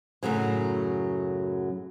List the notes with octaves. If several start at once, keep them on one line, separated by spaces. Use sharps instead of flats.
F#2 A2 C#3 F#3